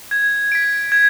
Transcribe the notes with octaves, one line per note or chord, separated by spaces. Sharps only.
G#6
B6 D7
G#6